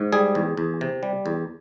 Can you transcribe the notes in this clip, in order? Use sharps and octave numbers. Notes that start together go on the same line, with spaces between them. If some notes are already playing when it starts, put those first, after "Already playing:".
Already playing: G#2
G3 G#4
E2
E2
C3
G3
E2